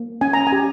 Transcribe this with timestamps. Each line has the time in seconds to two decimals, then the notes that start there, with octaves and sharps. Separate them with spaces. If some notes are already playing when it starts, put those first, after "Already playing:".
Already playing: A#3
0.21 C#4 G#5
0.33 A#5
0.47 G#5
0.52 G4